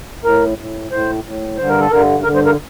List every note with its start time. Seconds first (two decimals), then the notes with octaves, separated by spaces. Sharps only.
0.24 A2 A#4
0.58 A2
0.91 A2 C5
1.24 A2
1.57 G2 D3 C5
1.69 A#4
1.80 A4
1.91 G2 D3 A#4
2.24 G2 D3 A#4
2.35 C5
2.46 A#4